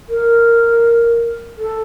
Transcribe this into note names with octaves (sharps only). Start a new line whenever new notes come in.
A#4
A4